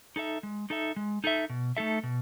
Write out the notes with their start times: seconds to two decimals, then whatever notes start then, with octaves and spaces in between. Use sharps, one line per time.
0.16 D#4 A4 E5
0.43 G#3
0.70 D#4 A4 E5
0.96 G#3
1.24 D#4 A4 E5
1.50 B2
1.77 A3 D#4 A4 E5
2.03 B2